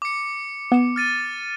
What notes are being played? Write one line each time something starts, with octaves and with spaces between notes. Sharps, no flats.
D6 C#7
B3 E7
F6 A6 D#7